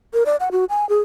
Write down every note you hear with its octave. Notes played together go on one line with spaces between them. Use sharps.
A#4
D5
F#5
F#4
G#5
G#4